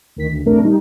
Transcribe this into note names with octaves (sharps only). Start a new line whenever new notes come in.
D2 D#3 B6
D2
A#1 E2 C3 A3 D4 A#4
G3 D#4